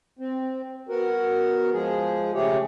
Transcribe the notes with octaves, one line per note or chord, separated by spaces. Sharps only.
C4
B3 F#4 A#4
F3 G#3 G#4
C#3 A3 G4 G#4 C#5